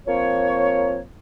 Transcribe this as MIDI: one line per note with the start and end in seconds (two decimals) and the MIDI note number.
0.08 1.00 53
0.08 1.00 58
0.08 1.00 60
0.08 1.00 73